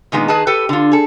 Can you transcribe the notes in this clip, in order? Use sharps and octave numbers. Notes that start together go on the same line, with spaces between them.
A#2 D#3 G#3 B3
D#3 G#4 B4 D#5 A5
G4 A4 B4
D3 F4
G#4 A4